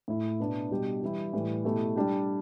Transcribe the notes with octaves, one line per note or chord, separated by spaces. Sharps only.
A2 A3 E4
B2 B3 D4
B2 G3 D4 G4
E3 G3 E4 G4
A2 E3 G3
B2 A3 E4 G4
G3 D4 G4